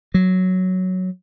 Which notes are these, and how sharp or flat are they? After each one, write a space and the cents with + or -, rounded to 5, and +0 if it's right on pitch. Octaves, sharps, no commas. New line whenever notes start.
F#3 +0